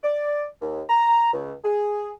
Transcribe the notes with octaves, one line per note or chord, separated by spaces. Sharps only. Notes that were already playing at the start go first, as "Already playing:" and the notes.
D5
D#2
A#5
C#2
G#4